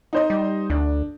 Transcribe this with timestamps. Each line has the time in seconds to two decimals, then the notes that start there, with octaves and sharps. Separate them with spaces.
0.13 D#4 C5 D#5
0.30 G3
0.70 D2 D4